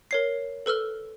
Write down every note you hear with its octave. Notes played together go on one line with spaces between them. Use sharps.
A#4 C#5 C7
A4 B4 E6 F6 G7